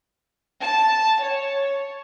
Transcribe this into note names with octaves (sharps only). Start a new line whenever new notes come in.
A5
C#5